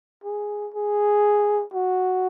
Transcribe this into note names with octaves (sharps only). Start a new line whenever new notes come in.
G#4
G#4
F#4